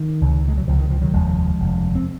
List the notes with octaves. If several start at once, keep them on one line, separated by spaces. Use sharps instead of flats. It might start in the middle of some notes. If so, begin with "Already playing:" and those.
Already playing: D#3
C#2 C3
G#3
F#3
C#2 C3 F3
D#3
F3
D#3 F#3
F1 D#2 C#3 F3 G#3
F1 D#2 C#3
C4